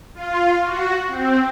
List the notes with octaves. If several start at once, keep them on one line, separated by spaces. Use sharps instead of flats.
F4
F#4
C4